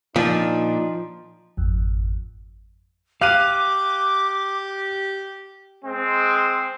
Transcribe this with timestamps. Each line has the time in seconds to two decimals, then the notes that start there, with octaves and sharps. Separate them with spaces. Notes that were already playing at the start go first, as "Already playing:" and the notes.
0.16 A#2 F3 D4 D#4
1.57 G#1 F2
3.21 G4 F5 D6 F#6 D#7
5.85 G#3 C4